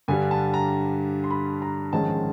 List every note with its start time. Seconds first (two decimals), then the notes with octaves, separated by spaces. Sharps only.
0.08 G2 D3 G3 G#5
0.31 A5
0.54 A#5
1.24 C6
1.31 B5
1.62 A#5
1.93 A#1 G#2 D#3 G#3 C#4 A5